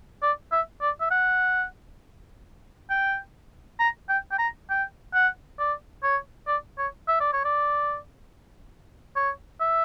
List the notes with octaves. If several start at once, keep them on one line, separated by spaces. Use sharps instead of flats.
D5
E5
D5
E5
F#5
G5
A#5
G5
G5
A#5
G5
F#5
D5
C#5
D5
C#5
E5
D5
C#5
D5
C#5
E5